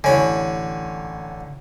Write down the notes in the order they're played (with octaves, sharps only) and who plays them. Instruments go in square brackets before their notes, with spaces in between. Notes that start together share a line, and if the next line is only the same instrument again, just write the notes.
[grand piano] A1 C#5 G#5 [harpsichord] D3 B5